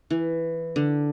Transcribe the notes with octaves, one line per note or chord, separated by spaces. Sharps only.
E3
D3